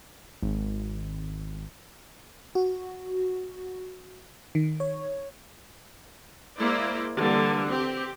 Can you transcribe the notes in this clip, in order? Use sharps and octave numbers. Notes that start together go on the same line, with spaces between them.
G#1
F#4
D#3
C#5
G#3 A#3 E4 C5 D5
D3 E3 G3 A#3
C4 G4